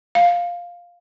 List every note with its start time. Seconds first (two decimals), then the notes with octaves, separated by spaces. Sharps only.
0.15 F5